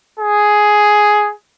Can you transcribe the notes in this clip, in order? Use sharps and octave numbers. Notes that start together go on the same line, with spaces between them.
G#4